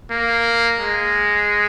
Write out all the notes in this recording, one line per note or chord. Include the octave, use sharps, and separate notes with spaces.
A#3
G#3